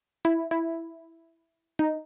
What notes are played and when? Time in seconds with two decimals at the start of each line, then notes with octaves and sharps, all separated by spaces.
0.25 E4
0.51 E4
1.79 D#4